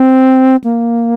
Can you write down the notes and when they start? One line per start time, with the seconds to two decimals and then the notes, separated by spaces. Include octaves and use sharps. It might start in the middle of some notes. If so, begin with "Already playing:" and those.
Already playing: C4
0.64 A#3